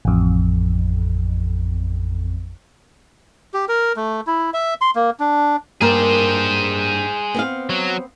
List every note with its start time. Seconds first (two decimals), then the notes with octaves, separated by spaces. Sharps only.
0.05 A1 F2
3.54 G4
3.68 A#4
3.96 A3
4.27 E4
4.54 E5
4.81 C6
4.95 A#3
5.20 D4
5.81 G2 A#3 G#4 A#4 C5
7.34 B3 C4 F5
7.70 F#3